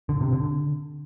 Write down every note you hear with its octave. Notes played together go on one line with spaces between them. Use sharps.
D3
C3
D3